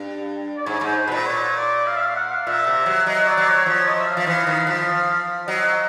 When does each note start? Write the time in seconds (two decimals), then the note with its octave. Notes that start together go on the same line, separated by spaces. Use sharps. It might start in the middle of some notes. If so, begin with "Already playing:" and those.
Already playing: G2
0.57 D5
0.66 G#2 C#5
0.81 G#2 C5
1.07 B2 B4
1.12 A#2
1.26 C#5
1.57 D5
1.86 F5
1.96 E5
2.01 F5
2.16 F#5
2.31 F5
2.46 A#2 E5
2.67 C3
2.86 F#3
3.06 F#3 D#5
3.27 D5
3.37 F#3
3.47 C#5
3.66 F3 C#5
3.87 D#5
4.00 E5
4.07 F5
4.17 F3
4.26 E3 F5
4.47 D#3
4.60 E3
4.67 F3
5.47 F#3 D#5